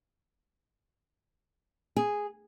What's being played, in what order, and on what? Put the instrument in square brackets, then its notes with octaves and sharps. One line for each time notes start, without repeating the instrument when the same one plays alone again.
[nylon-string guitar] G#4